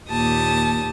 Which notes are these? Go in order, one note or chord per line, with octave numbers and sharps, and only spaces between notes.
D#2 A#2 G4 A5 D#6